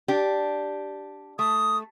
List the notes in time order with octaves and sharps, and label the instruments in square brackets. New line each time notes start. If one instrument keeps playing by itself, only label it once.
[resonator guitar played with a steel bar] D4 G4
[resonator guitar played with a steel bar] A3 [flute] D#6